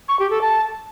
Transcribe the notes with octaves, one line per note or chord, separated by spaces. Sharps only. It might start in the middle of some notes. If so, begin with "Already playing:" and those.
C#6
G4
A4
A5